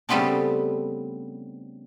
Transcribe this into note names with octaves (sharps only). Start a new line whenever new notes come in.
C#3 G3 A3 B3 C4 D4